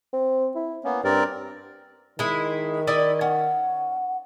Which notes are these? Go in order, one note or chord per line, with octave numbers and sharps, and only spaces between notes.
C4
E4
A#3 B3 C#4
G2 C4 A#4 D5
D#3 G#3 E4
E4 D5 D#5
C#4 F#5